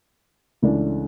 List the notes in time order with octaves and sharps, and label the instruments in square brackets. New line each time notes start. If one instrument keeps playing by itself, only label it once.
[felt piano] C#2 C#3 E3 A3 D4